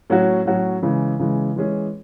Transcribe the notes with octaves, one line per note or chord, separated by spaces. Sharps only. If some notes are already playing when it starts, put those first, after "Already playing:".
A2 F#3 C#4 F#4
A2 F#3 C#4 F#4
C#3 E3 G#3
C#3 E3 G#3
E3 G#3 C#4 G#4